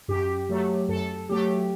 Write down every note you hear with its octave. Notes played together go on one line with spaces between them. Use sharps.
F#2 G4
F#3 A3
F#2 A4
F#3 A3 G4